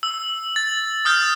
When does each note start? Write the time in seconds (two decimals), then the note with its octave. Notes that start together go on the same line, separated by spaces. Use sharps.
0.03 E6
0.56 A6
1.05 D#6 F6 G6 A6